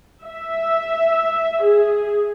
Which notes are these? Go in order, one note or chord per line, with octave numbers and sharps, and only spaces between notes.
E5
G#4